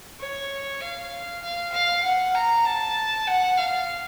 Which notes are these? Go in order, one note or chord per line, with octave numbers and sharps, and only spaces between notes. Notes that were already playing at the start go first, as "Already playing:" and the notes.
C#5
F5
F5
F5
F#5
A#5
A5
F#5
F5